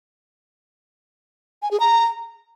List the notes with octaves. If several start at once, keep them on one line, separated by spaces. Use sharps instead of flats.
G#5
G#4
A#5